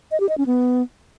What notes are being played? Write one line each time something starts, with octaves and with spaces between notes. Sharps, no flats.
D#5
G4
D#5
C#4
B3